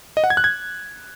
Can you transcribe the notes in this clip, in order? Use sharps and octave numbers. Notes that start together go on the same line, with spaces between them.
D#5
F#5
G#6
F#6
G#6